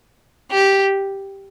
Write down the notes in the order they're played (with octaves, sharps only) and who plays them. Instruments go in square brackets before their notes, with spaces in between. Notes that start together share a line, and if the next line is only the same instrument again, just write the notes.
[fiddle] G4